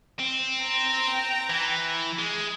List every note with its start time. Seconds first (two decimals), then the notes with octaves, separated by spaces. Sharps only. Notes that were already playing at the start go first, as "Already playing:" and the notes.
0.19 C4
0.62 G5 A#5
1.50 E3
2.19 G#3